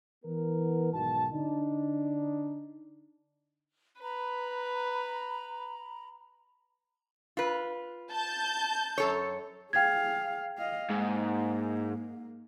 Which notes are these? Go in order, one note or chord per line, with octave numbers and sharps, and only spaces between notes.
E3 B3 A#4 B4
B1 G#2 D#3 F#4 A5
D3 D4 D#4
B4 A#5 B5
F4 B4
A5 G6
F#2 A4 C#5
G#4 F5 G5 G#6
D#5 F5
G#2 A#3